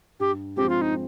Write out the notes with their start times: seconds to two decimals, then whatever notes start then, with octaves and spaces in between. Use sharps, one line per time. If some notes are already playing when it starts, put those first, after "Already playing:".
0.20 G2 G4
0.57 F3 G#3 C4 G4
0.69 F4
0.81 D#4